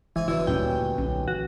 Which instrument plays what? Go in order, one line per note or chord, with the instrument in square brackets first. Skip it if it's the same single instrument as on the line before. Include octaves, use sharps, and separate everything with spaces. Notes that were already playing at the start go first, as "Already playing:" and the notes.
[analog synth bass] F#1 [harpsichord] G#2 G#5 [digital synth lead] E3
[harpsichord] B2 D3 F#3 [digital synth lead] E4
[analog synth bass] D2 [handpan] A#2 G3 C#4 [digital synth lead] G5
[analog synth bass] B1 [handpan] C#4
[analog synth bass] E3 [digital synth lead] F#4